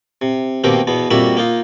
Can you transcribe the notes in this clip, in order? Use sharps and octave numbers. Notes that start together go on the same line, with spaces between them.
C3
B2 D#3 A#3 C4 G4
E2 B2 B3
F2 G3 A#3 F#4 E5 B5
A#3 D#4 F4